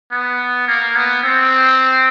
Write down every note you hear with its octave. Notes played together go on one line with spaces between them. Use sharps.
B3
A#3
B3
C4